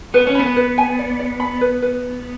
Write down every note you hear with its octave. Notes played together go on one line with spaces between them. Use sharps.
B3 B4
C#4
B3 B5
B4
G#5
D5
D5
B5
B4
B4